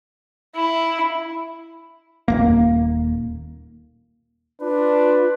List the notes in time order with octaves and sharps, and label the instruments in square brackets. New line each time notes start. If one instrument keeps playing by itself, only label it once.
[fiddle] E4
[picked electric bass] D#1 E2 A#3
[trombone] D4 [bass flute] F4 [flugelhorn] B4